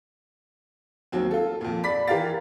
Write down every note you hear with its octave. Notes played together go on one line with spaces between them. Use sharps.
D#2 F#3 C4
F4 A4
F2 A#2
D5 B5 B6
E3 G4 A#4 F5 A6